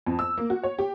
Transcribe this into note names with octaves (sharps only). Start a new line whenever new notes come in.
F2
E6
A#3
F#4
C#5
G4